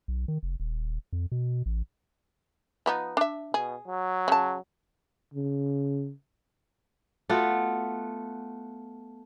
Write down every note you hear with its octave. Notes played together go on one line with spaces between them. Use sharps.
B1
D#3
F1
D#1
F2
B2
A1
F3 B3 D#4
D4 E5
B2 G#4
F#3
C#3 A5
C#3
A3 B3 F4 F#4